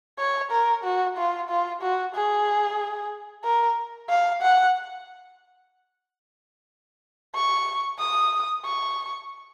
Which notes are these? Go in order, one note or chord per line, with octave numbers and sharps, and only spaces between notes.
C#5
A#4
F#4
F4
F4
F#4
G#4
A#4
F5
F#5
C#6
D#6
C#6